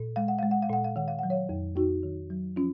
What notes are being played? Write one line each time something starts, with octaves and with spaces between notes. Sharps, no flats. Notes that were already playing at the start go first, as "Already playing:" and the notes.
Already playing: A#2
G#3 F5
F#5
G#3 F5
F#5
F5
A#2 F#5
F5
D#3 F#5
F5
F#3 F#5
C#5 F5
F2
F2 D#4 F#4
D#3
F#3
F3 C#4 F4